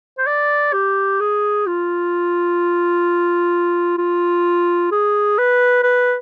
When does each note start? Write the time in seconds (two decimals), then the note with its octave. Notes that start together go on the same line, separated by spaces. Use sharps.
0.18 C5
0.26 D5
0.73 G4
1.20 G#4
1.66 F4
3.98 F4
4.91 G#4
5.38 B4
5.83 B4